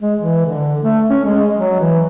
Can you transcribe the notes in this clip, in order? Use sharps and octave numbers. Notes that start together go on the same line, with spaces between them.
G#3
E3
D3
A3
C#4
G#3
F#3
E3